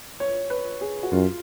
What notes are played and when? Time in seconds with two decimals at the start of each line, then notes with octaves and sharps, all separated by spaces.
0.20 C#5
0.50 B4
0.81 G#4
1.03 F#4
1.12 F#2 F4